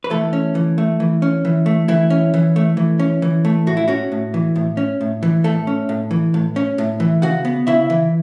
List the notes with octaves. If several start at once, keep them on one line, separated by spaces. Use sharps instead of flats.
B4
E3 A3 A4
C#4
E3
A3
E3
C#4
E3
A3
E3 E4
C#4
E3
A3
E3
C#4
E3
A3
A2 F#4
E4
C#4 F#4
A2
E3
A2
C#4
A2
E3
A2 A3 A4
C#4
A2
E3
A2
C#4
A2
E3
C#3 F#4 F#5
B3
C#3 E4 E5
E3